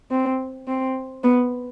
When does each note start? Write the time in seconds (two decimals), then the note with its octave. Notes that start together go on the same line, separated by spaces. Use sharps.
0.11 C4
0.68 C4
1.24 B3